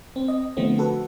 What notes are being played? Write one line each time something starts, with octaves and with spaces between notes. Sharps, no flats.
C4
D#5
D3 F3 A3 B3 C4
F#4 A4 B4